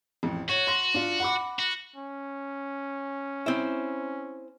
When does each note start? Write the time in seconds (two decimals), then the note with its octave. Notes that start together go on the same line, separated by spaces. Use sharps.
0.23 A1 F2
0.49 F#4 C#5
0.67 C6 A#6
0.94 D4 F4
1.20 F#5 B5 D6
1.59 F#4
1.96 C#4
3.46 C4 E4